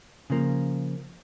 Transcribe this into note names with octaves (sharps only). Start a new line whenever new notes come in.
C#3 F3 A#3